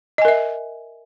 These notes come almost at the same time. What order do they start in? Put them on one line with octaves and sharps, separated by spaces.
D#5 G#5 A#4 E5